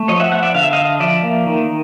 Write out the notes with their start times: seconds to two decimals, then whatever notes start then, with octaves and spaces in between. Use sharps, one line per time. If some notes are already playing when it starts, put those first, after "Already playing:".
Already playing: A3
0.08 F3 C#5 D#5
0.20 E5 F#5
0.31 B3 E5 F#5
0.43 D5 E5
0.54 D3 F5
0.63 E5
0.73 D3 D#5 F5
1.00 F3 D5 E5
1.23 A#3
1.46 D#3